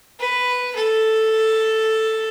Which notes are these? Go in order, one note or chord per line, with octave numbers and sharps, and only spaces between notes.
B4
A4